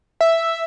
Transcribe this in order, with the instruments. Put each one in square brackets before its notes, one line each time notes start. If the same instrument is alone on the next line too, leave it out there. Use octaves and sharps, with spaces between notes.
[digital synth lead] E5